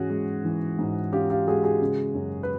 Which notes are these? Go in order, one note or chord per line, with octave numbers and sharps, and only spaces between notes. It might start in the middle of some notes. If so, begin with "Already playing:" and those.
Already playing: G#2 E3 C#4 F#4 G#4
G#3
E3
G#2
C#4 F4 G4
F4 G4
G#3 F#4 G#4
F#4 G#4
C#3
F#2
B4